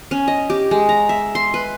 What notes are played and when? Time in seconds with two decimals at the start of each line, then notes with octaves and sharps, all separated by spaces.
0.11 C#4
0.28 D#5
0.50 G4
0.71 G#3
0.89 A#5
1.09 E5
1.35 C6
1.54 B4